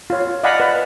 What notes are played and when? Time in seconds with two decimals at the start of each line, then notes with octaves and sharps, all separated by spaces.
0.10 F4 C#5
0.43 D5 D#5 F5 F#5 G#5 B5
0.60 B4